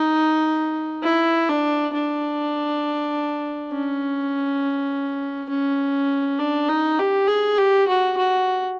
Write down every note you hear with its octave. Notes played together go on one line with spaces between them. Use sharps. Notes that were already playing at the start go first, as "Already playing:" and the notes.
Already playing: D#4
E4
D4
D4
C#4
C#4
D4
D#4
G4
G#4
G4
F#4
F#4